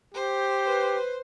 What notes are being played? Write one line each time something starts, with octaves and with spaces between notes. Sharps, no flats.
G4 C5
B4